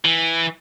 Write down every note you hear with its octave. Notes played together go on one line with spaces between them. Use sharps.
E3